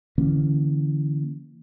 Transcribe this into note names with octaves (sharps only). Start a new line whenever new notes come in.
D3 E3 A#3 C#4